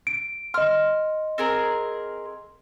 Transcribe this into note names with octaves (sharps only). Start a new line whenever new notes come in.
D7
D#5 C6 F6
C4 G#4 A#4